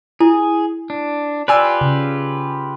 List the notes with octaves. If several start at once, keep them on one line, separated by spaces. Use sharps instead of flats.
E4 G#4
D4
F4 G4 B4 D5 G#5 E6
C#3